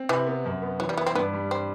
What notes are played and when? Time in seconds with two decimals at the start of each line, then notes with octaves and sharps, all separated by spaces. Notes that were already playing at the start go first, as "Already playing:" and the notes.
Already playing: C4
0.09 C3 E3
0.26 B3
0.45 F#2
0.62 B3
0.80 E3 F#3
0.89 G3
0.97 B3 E4
1.06 C4
1.15 G2 B3
1.33 G3
1.51 C4